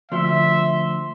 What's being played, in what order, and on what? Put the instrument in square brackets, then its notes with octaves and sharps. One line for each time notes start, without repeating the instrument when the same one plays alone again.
[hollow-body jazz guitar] D2 F3 [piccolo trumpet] E5 [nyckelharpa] C6